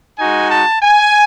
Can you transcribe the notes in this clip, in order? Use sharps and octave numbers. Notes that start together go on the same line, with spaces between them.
G#3 D#4 F#4 G#5
A5
G#5